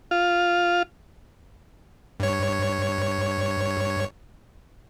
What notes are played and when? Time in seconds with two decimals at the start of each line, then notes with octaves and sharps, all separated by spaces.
0.11 F4
2.20 G2 C#5